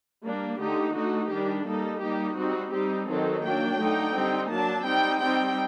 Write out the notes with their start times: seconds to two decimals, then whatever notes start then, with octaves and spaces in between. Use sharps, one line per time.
0.24 G3 A#3 D4
0.60 D3 A3 D#4 G4
0.95 D3 A3 D#4 F#4
1.30 D#3 G3 D4 G4
1.66 G3 A#3 D#4 A4
2.01 G3 A#3 D#4 G4
2.37 G3 C4 D#4 F#4
2.72 G3 C4 D#4 G4
3.08 D#3 F#3 C4 D#4 A4
3.43 F#3 A#3 D4 G5
3.79 D3 A3 D#4
4.15 G3 C4 D#4
4.50 F#3 A#3 D4 A5
4.85 G3 C4 D#4 G5
5.21 G3 C4 D#4 G5